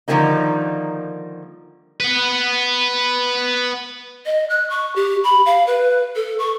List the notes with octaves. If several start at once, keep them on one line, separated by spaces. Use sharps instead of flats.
D3 D#3 F3 G3 A#3 D#4
B4 F#5
D#5
F#6
C#6
G4
B5
F5
B4
A4
C#6